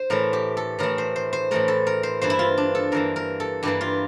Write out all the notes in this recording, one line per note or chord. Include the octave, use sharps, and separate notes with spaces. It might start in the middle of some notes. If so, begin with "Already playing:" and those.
Already playing: C5
A2 E3 A3 A#4
G4
A4
A2 E3 A3 A#4
C5
C5
C5
A2 E3 A3 A#4
A4
A#4
C5
G2 E3 A#3 C5
E4
F4
D4
A4
G2 E3 A#3 A#4
A#4
A4
G2 E3 A#3 G4
F4